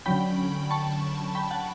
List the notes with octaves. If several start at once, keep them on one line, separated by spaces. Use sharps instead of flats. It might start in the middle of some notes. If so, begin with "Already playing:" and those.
D3 F#3 C#4 G5 B5
A5 C#6
G5 B5
F#5 A5